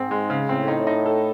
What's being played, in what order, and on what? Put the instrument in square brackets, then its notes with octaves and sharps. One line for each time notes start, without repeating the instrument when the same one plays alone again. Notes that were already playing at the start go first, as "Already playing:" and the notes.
Already playing: [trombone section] G#2 [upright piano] C4
[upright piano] G#3
C#3
[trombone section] A2 [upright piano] C4
[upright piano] D#4
D#4
A4